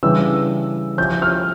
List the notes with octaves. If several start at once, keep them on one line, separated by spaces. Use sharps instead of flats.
C#3 E3 G3 D4 G4 E6
F3 C#4 E4 G4 G6
F6